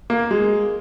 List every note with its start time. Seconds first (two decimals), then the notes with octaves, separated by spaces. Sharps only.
0.10 A#3
0.31 G#3